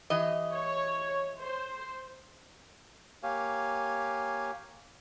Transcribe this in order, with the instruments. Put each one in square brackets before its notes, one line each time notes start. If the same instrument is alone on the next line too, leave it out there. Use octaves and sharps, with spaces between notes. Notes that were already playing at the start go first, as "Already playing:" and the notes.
[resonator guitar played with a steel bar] E3 G4 D#5
[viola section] C#5
C5
[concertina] A#3 G4 C#5 F5 G#5